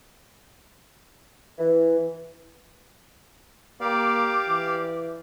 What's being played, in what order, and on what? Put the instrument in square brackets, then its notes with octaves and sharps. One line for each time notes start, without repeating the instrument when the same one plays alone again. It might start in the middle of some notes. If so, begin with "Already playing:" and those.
[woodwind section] E3
[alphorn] A#3 [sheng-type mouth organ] G4 D5 F5 [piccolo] D6
[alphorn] E3